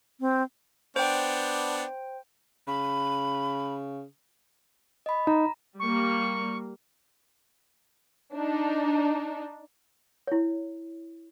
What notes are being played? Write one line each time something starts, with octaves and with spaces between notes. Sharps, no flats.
C4
B3 D4 C5 G5
C#3 B5
D#5 B5
D#4 A#5
G3 A#3 C#6
D4 D#4
E4 C#5